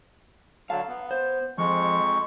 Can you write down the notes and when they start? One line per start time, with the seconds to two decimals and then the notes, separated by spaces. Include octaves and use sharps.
0.70 D3 F#3 F5 A5
0.88 B3
1.11 C5
1.58 F2 F3 G#3 C#6